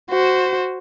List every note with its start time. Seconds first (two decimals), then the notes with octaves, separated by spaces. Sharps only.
0.10 F#4 C5